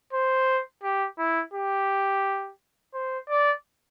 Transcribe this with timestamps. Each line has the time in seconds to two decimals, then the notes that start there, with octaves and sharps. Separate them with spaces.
0.13 C5
0.83 G4
1.18 E4
1.54 G4
2.94 C5
3.29 D5